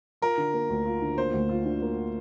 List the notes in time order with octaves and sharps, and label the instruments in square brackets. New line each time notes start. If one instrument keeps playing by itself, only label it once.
[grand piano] F4 [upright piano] A#4
[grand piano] D3
A#3
D2
F4
D3
[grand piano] A#3 [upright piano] C5
[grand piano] D2
F4
D3
A#3